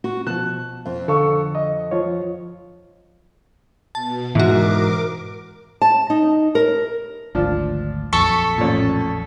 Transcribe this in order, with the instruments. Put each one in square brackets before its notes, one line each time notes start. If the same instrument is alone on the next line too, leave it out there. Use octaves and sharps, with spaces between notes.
[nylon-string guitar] F#4
[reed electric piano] B2 F3 [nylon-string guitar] A5 [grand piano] F#6
[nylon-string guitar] F2
[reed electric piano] D3 [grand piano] A4 F5 C#6
[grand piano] D#5
[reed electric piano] F3 F4 C#5
[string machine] B2 [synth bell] A5
[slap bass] G#2 [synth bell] E3 F#4 [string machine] A#4 D6
[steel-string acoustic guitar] A5
D#4
A#4
[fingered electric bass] G#1 D2 [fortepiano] F3 D4
[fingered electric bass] A#1 F2 F#3 [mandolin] A4 [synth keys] C#6 A6 B6
[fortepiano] A1 A#2